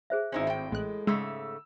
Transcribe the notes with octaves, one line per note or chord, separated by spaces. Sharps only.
G#4 C5 E5
G#1 C4 C#4 D#4 E4
A2 G5
A1 G#3 F#6
G#2 C#3 G#3 A3 E6